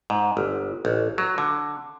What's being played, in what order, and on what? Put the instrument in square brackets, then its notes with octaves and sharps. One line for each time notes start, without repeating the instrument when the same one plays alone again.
[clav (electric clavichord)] G#2
G1
A1
F#3
D3